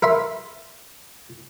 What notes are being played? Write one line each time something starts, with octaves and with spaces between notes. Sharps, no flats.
A#4 E5 B5 C6